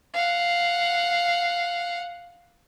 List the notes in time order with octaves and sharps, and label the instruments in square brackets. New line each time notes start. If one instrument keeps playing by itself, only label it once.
[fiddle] F5 F#5